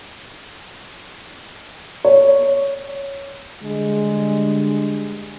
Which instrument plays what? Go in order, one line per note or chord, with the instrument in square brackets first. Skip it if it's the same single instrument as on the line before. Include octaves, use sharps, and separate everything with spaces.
[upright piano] C#5
[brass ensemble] D3 G3 G#3